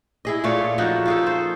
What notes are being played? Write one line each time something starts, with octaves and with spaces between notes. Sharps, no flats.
E4 G#4 D#5
A#2 A3 F4 C#5
F3 C#4 D#4 F#4
F4 G#4 A4
C5